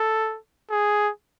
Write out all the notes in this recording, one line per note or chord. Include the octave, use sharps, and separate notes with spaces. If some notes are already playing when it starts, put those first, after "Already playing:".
Already playing: A4
G#4